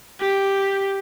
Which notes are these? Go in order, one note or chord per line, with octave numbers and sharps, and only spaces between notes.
G4